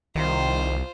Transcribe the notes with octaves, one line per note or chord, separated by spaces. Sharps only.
C2 D#3 F4 C5